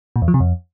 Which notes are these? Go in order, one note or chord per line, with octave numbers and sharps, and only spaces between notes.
A#2
E2
F3
C3
F2